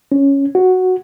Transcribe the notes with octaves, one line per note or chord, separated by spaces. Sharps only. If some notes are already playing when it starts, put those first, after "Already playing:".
C#4
F#4